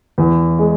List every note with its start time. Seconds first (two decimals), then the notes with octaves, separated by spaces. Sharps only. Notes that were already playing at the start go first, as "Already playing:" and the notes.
0.18 E2
0.59 G#3